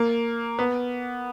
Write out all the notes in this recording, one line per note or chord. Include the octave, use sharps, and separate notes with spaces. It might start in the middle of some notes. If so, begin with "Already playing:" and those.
Already playing: A#3
B3